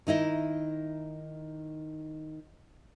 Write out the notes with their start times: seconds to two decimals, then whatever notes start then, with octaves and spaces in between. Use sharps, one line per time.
0.07 D#3 D#4 E4 D#5